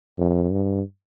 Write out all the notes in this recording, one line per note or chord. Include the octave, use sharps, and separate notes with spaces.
F2
G2